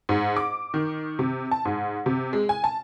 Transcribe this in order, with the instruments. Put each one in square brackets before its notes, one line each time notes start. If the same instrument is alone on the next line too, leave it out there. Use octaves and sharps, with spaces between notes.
[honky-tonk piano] G#2
D6
D#3
C3
A5
G#2
C3
G#3
G#5
A5